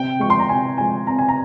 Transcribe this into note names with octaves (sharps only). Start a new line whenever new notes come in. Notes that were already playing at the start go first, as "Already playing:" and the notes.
Already playing: C3 G5
F3 G#3 C#6
C6
A#5
C3 G#5
F3 G#3 G#5
C3 A#5
G#5
A#5